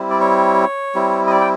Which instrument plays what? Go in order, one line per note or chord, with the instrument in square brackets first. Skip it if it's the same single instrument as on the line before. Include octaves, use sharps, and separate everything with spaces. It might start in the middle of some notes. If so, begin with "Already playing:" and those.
Already playing: [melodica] G3 C4 E4
D5
C#5
G3 C4 E4
D#5
D5
G5